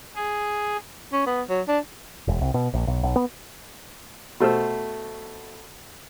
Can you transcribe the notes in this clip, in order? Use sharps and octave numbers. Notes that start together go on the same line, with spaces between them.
G#4
C#4
B3
F#3
D4
E1
C2
B2
A#1
B1
B1
B3
B2 A3 C5 E6